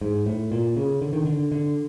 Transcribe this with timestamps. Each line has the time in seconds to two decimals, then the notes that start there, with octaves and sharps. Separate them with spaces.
0.01 G#2
0.26 A2
0.52 A#2
0.77 C#3
1.02 D3
1.13 D#3
1.25 D3
1.52 D3